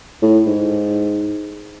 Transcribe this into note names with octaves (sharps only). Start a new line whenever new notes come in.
A2
G#2